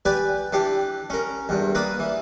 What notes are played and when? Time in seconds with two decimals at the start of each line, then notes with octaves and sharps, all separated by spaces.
0.05 G4 B4 D5 G#5
0.53 E3 D4 G4
1.10 C#4 A#4
1.49 E2 G2
1.75 A#3 B4 D5 D#6
1.99 E3